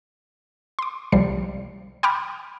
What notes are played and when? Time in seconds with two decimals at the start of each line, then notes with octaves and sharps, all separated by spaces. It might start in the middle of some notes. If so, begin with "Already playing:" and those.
0.79 C6 D6
1.12 C2 F3 G3 C7
2.03 G5 G#5 B5 C6 D6 F6